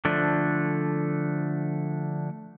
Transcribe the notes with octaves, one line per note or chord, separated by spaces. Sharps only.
D3 F3 A3 D4